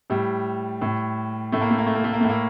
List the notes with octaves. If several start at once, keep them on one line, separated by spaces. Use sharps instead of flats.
A2 G3
A2
A2 A3
A#3
A3
A#3
A3
A#3
A3
A#3
A2 A3
A#3